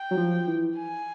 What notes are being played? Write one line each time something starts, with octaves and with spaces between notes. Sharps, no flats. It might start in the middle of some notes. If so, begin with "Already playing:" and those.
Already playing: G5
F#3
F3
E3
G#5